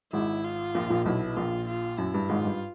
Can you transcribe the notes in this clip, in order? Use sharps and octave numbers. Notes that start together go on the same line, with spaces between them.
G#1 G#2 E4
F4
A#1 A#2
A#1 A#2
B1 B2 E4
A#1 A#2 F4
F4
F#2 E4
G2
G#1 G#2 F4
G2